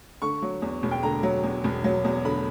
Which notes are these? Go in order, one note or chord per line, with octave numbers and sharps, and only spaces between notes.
D3 C#6
F#3
E2
E1
G5
D3 A#5
F#3
E2
E1
F#3
E2
D3 B5